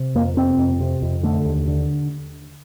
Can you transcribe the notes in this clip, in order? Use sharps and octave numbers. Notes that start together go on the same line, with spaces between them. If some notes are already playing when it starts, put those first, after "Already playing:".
Already playing: C3
F2 A#3
C3 C4
F2
C3
F2
D3 A3
D#2
D3